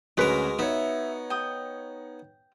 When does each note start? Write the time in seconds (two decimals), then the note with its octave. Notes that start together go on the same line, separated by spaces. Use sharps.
0.17 D2 G#3 C#4 F#4 A#4 B4
0.59 B3 D#4 C#5 E5
1.30 G5 D#6